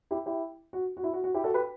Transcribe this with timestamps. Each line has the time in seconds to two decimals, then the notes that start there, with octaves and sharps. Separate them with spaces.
0.11 E4 G4
0.26 E4 G4
0.73 F#4
0.97 F#4
1.04 E4
1.13 F#4
1.24 F#4
1.34 E4 G4
1.44 F#4 A4
1.54 G4 B4